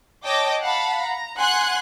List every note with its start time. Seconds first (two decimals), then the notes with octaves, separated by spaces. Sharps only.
0.25 C#5 D#5 G5 A5 D6
0.61 F5 F#5 A5 B5
1.02 A#5
1.37 F#5 G#5 C6 F#6